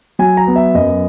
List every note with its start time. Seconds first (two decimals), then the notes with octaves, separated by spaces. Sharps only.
0.19 F#3 G#5
0.37 A#5
0.47 B3
0.56 E5
0.74 F#2 D#5